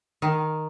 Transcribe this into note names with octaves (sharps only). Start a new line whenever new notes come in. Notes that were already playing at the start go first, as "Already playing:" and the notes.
D#3